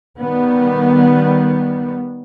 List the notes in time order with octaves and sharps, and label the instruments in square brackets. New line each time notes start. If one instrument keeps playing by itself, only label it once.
[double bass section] D#3 G3 B3